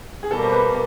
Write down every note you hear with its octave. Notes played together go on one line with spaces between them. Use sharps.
G#4
B2 G3 A#3 A4
C5
B4